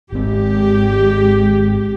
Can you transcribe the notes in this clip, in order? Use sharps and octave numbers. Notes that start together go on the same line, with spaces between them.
G#1 G#3 C4 G4